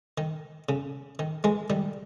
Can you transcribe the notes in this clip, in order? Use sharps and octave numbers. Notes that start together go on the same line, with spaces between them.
D#3
C#3
D#3
E3 G#3
D#3 G3